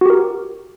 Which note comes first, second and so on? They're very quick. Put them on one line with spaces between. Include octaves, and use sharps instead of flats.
F#4 G4 A#4